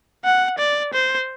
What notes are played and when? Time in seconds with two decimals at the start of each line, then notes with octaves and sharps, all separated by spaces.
0.25 F#5
0.59 D5
0.93 C5